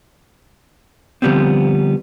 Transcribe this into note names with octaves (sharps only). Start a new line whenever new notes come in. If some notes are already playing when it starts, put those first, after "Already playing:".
D3 F3 G3 B3 C4